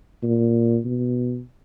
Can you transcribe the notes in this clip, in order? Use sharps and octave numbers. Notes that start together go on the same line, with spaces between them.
A#2
B2